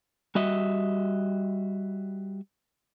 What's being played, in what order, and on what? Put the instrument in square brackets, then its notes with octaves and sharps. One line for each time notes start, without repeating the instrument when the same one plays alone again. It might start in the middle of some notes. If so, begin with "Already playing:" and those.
[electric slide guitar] G3 F#4 D#5 E5